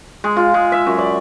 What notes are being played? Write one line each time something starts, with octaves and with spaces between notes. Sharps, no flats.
G#3
F4
G#3
E5
F#2
D5